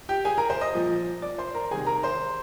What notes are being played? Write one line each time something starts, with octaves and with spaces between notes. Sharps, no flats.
G4 G5
G#4 G#5
A#4 A#5
C5 C6
D#5 D#6
A#2 F3
D5 D6
C5 C6
A#4 A#5
C3 D#3 G#4 G#5
A#4 A#5
C5 C6